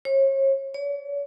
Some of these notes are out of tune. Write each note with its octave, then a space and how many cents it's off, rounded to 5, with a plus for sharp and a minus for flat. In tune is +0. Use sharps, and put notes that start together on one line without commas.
C#5 -35
C#5 +45